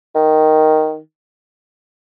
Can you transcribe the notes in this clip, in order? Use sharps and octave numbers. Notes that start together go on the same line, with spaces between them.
D#3